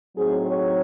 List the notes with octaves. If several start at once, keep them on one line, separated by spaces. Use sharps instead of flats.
A2 F#3 C4 D#4 G#4
C#5